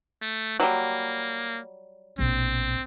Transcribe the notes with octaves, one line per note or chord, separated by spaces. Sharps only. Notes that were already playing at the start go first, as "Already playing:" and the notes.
A3
F#3 G3 A#3
A#1 B2 C4